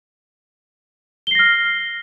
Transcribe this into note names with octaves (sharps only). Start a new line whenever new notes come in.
F6 A#6 C7 G7